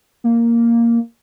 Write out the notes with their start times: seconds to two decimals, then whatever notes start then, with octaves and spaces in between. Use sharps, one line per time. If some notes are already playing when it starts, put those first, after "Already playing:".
0.24 A#3